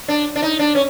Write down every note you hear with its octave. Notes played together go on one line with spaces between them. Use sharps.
D4
D4
D#4
D4
C#4